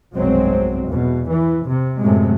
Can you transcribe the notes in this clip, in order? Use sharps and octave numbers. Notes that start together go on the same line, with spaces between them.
F1 B1 G2 F#3 G#3 C4
E2 B2
E3
C3
F#2 A2 C3 F#3 G#3 A3